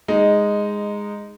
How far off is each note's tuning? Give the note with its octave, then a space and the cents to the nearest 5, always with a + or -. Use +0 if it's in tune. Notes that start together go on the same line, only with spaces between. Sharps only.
G#3 -10 D#4 +0